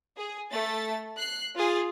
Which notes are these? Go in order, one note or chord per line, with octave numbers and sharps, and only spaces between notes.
G#4
A3 A6
F#6 C7
F4 G#4 A6